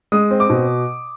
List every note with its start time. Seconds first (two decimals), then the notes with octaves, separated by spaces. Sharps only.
0.12 G#3 D#6
0.31 C4
0.40 D6
0.50 B2